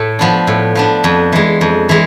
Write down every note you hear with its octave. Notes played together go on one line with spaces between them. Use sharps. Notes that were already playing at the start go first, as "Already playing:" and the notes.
Already playing: A2 A3
F3 B3 D4
A2
F3 B3 D4
F2
E3 G#3
F2
E3 G#3